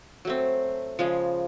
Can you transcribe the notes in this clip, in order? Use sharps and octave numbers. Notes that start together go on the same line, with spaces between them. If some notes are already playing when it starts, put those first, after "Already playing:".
F#3 A3 C4
C#3 F3 G#3